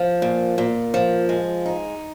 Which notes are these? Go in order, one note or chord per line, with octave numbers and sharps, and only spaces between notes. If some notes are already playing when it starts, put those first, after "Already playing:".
Already playing: F3
A#2
A#2
F3
G#3
D#4